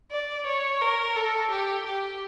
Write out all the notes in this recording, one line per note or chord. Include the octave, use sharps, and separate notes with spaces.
D5
C#5
A#4
A4
G4
G4